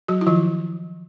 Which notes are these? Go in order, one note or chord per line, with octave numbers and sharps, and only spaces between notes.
F#3 F#4
E4
D#3 F3 F4